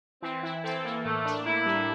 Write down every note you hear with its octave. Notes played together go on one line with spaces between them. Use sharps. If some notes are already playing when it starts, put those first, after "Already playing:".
E3 C4
E4
C4 A4
A#3
A2 A3
D4
A2 E4
G3